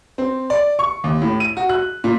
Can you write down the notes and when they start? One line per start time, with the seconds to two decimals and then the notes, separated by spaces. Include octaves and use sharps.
0.18 C4
0.50 D5
0.79 C#6
1.04 D#2
1.22 A2
1.40 D#7
1.57 F#4
1.69 F#6
2.04 A#2